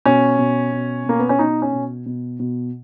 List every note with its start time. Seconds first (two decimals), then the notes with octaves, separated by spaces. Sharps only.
0.05 B2 C#4
0.39 B2
0.72 B2
1.06 B2 A#3
1.19 B3
1.29 C#4
1.39 B2 D#4
1.62 C#4
1.73 B2
2.06 B2
2.40 B2